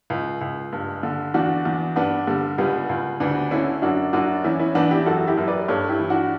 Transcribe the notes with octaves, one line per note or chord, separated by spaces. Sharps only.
C#2
C#2
G2
D3
E2 D4 F#4
E2
G2 B3 D4
D3 G3
C#2 G3 B3
C#2
D2 B3 D4
D3 C#4 E4
F#2 D4 F#4
F#2 D4 F#4
E2 C#4 E4
C#4 E4
E2 B3 D4
E4 G4
F#2 F#4 A4
E4 G4
F#2
B4 D5
G2 A4 C#5
E4 G4
E3
D4 F#4